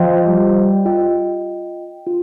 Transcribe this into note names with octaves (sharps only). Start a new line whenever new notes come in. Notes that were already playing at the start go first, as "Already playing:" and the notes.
Already playing: F3 F4 C5 D#5 G5
G3
F4 D#5 G5
F4